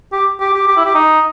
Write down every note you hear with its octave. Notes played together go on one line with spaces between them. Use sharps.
G4
G4
G4
G4
E4
G4
D#4